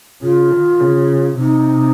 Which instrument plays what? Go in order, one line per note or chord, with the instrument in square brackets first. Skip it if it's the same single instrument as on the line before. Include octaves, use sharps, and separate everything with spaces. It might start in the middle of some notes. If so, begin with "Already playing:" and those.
[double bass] C#3 [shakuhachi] F4
[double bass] D#3
C#3
[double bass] C3 [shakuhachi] D#4